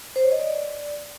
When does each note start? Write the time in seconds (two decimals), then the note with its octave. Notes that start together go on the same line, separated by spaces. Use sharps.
0.16 C5
0.24 C#5
0.32 D#5
0.40 D5